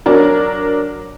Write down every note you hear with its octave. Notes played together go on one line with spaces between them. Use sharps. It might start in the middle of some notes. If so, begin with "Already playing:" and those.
F#3 D4 A#4